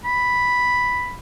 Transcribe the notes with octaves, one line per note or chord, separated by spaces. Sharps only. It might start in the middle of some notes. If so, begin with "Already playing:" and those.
B5